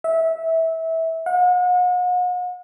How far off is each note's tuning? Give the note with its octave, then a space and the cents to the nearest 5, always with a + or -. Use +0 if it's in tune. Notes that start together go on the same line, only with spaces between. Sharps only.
E5 -20
F#5 -40